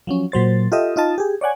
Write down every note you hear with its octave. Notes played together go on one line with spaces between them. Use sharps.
F3 F#3 C#4
A#2 F#3 C5 A6
F4 G4 A4 D#5 E5
D#4 F4 D#5 A5
G4 G#4
C#5 D5 F#5 G#5